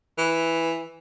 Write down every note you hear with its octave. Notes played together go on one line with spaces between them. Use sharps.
E3